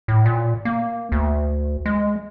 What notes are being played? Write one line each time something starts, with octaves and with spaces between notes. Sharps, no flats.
A2
A#2
A#3
D2
G#3